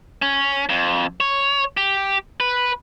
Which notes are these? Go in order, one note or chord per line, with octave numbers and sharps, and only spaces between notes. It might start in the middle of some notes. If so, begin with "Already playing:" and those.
C#4
F2
C#5
G4
B4